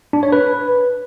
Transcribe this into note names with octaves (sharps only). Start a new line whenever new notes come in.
D4
C#5
B4